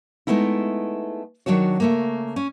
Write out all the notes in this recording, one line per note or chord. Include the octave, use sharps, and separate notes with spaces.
G#3 A3 B3 D#4 E4
D#3 F#3 D4 F#4 C#5
C#3 A3 A#3
C#4